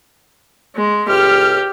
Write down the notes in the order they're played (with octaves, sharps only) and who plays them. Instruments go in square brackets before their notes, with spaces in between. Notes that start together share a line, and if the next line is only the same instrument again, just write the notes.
[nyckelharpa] G#3
[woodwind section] C#2 A2 F6 [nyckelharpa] G4